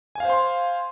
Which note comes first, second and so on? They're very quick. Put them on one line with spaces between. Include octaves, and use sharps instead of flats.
G#5 F5 C5 C6